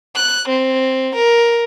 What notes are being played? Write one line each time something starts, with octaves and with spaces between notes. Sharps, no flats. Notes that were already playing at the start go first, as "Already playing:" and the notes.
F#6
C4
A#4